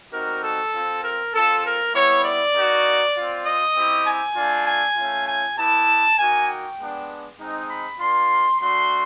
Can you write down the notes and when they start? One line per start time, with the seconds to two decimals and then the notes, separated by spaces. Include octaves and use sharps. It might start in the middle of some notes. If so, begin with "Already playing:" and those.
0.12 G3 C4 D#4 F#4 A#4
0.43 A4
0.73 C4 F4
1.03 A#4
1.33 C4 F4 A4
1.64 A#4
1.94 G3 B3 E4 C#5
2.24 D5
2.54 A#3 D#4 F#4
3.15 C4 F4
3.45 D#5
3.75 C4 E4 G4
4.05 G#5
4.36 A3 D4 F4
4.66 G#5
4.96 A3 C#4 F4
5.27 G#5
5.57 B3 E4 G4 A5
6.17 A#3 D#4 F#4 G#5
6.47 G5
6.78 G#3 B3 D4
7.38 G#3 C4 D#4
7.69 B5
7.99 A#3 D4 F4 C6
8.59 A3 D4 F#4 C6